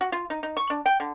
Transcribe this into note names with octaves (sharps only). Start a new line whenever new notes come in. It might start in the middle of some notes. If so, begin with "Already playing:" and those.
F#4
F4
D#4
D#4
C#6
D4
G5
D3